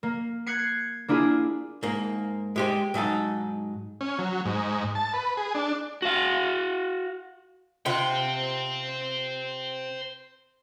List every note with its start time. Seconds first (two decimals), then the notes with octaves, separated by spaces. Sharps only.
0.03 A#3
0.47 F#6 G#6 C7 C#7
1.08 A#3 D4 E4 F4 G#4
1.83 G#2 A#3
2.56 G#3 G4 C5
2.94 G#2 F#3 D#4 A4
4.01 C#4
4.19 F#3
4.46 G#2
4.95 A5
5.14 B4
5.37 G#4
5.55 D4
6.02 F#4 F5
7.86 C3 F4 C5 F#5 G5